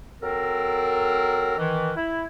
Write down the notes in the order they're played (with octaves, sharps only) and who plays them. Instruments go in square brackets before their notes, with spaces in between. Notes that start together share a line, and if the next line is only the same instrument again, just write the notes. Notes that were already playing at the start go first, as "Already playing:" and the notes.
[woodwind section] F#3 C4 A4 A#4
D#3 E3
E4